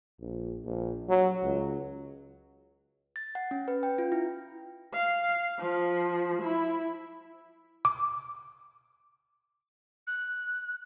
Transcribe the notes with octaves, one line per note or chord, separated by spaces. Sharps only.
A#1
A#1
F#3
C#2
A6
F#5
C#4
B4
G5
F4
E4
F5
F3
E4
D6
F#6